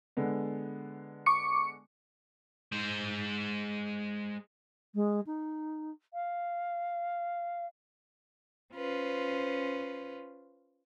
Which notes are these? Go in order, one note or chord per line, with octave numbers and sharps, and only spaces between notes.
D3 G#3 B3
C#6 D6 C#7
G#3 C5
G#3
D#4
F5
C#4 F4 B4 C5